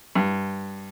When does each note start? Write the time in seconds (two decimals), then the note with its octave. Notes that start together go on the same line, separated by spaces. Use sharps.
0.15 G2